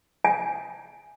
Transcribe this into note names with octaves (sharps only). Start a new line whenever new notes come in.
G#5